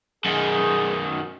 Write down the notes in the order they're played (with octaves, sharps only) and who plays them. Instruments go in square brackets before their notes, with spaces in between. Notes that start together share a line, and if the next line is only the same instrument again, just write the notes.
[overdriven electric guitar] F#2 D#3 [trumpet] G#4